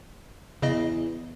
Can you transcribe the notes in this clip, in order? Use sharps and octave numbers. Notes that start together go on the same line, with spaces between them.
E2 C#3 D#5